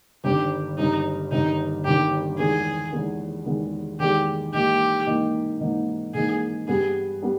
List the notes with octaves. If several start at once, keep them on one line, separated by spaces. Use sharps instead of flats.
G1 G2 D#3 G4
G1 G2 D#3 D#4
G1 G2 D#3 D#4
G1 G2 D#3 G4
E2 D#3 G#3 B3 G#4
E2 D#3 G#3 B3
E2 D#3 G#3 B3
E2 D#3 G#3 B3 G4
G#2 E3 A#3 D#4 G4
G#2 E3 A#3 D#4
G#2 E3 A#3 D#4
G#2 E3 A#3 D#4 G#4
G2 G3 B3 G#4
G3 B3